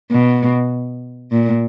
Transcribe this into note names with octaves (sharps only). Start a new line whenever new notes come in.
B2
A#2